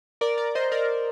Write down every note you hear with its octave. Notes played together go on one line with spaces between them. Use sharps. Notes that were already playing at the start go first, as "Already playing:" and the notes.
A#4 D5
A#4 D5
C5 D#5
A#4 D5